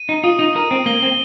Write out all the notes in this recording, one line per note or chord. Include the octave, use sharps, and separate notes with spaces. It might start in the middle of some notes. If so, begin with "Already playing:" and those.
Already playing: D#7
D#4
F4 D#6
D#4
A#4 D#7
C4
A#3 G7
C4